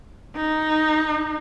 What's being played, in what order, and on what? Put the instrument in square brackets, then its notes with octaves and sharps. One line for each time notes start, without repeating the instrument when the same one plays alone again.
[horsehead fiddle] D#4